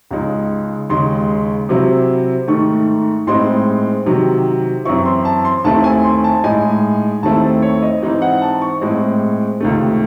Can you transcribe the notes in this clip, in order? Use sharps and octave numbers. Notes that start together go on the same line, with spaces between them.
C#2 C#3 G#3 D#4
D#2 C#3 G#3 C6
C3 F#3 C4 E4
G#2 D#3 A3 C#6
A2 G#3 C4 D#4 C6
C3 D#3 F#3
F#2 E3 C4 E4 C#6
C6
A5
C6
D#2 D#3 A3 C4 E4 A5
G#5
C6
A5
A2 G#3 D#4 G#5
D#2 D#3 A3 C4 E4 A5
C#5
D#5
G#2 E3 C4 D#4
F#5
A5
C#6
A2 G#3 C4
C#2 C3 D#3 A3